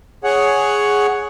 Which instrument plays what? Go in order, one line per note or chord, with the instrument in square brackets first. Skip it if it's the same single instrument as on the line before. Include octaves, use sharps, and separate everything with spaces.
[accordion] G#4 C#5 F#5